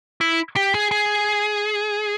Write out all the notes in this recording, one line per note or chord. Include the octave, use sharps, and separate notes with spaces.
E4
G4
G#4
G#4